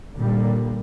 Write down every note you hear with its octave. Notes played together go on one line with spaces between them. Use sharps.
A#2 D3 G3 A#3